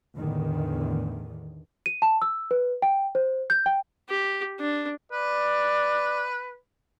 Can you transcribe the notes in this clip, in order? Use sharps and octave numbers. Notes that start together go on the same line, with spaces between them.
E2 A2 D3 D#3
D#7
A5
E6
B4
G5
C5
G6
G5
G4
D4
B4 D5